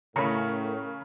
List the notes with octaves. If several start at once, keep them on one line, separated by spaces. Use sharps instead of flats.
A2 C#3 C#4 A#4 A#5 B5 C#7